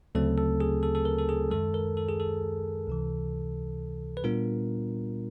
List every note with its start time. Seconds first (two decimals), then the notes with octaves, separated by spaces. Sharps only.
0.15 D2 C#3 F#3 A3 C4 A4
0.38 A4
0.61 G#4
0.83 A4
0.95 A4
1.05 A#4
1.18 A4
1.29 G#4
1.51 F#2 D#3 G#3 A4
1.74 A#4
1.97 A4
2.09 G#4
2.20 A4
2.87 C#2 C3 E3
4.17 B4
4.24 A#2 G3 B3 D4 F4 A#4